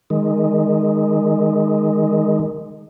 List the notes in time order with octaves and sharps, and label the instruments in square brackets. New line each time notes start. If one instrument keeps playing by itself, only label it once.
[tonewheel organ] D#3 G#3